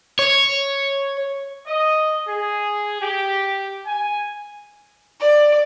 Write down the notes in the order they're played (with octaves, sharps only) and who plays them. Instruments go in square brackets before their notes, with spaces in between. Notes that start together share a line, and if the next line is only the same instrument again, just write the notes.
[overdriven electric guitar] C#5
[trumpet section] D#5
G#4
G4
G#5
[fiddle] D5